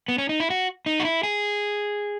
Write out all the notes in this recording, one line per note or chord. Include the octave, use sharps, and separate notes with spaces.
B3
C#4
D#4
E4
F#4
D#4
F#4
E4
G#4